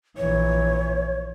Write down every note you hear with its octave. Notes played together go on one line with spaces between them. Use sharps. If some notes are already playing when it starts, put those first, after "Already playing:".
A#1 E3 C#5